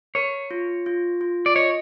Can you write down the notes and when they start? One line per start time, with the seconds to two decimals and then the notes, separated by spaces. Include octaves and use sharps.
0.15 A#4 C#5
0.51 F4
0.86 F4
1.21 F4
1.46 D5
1.55 C#5 D#5